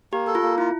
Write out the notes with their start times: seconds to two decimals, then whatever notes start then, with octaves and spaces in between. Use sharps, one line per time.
0.13 A#3 G4
0.27 A4
0.35 F4
0.43 A#3
0.58 E4 F4